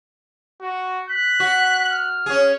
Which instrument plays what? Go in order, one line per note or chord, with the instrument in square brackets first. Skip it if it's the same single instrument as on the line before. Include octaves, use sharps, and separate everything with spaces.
[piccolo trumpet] F#4
[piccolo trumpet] F#6 [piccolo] B6
[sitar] F#4
[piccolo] F6
[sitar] C#4 G#4